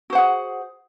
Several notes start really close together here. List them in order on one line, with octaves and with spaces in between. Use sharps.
F#4 C5 F#5 G#4